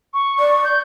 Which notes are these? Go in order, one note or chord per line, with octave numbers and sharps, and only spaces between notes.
C#6
D5
G6